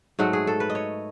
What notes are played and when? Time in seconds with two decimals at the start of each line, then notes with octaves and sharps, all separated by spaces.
0.19 G#2 F#3 A3 F#4
0.33 G#4
0.47 A4
0.60 B4
0.70 D#5
0.75 C#5